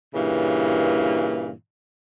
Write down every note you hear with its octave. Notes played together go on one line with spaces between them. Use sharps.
G2 A#2 C#3 E3